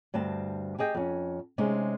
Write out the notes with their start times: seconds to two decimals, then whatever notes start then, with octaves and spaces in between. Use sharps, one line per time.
0.14 D2 G2 C4 A5
0.79 G4 G#4 D#5 G5
0.95 F2 C#4
1.58 C3 G#3 C#4 D#4